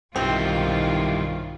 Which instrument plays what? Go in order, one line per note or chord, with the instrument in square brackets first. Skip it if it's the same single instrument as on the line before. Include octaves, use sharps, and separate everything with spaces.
[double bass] B1 D#3 [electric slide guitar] G2 E4 G4 [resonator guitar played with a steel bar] C4 [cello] F4